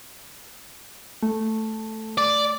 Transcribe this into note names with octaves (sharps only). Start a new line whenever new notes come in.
A3
D5